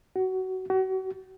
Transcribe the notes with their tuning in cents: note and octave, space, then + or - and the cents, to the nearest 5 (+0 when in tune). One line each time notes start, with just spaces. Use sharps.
F#4 +20
F#4 +35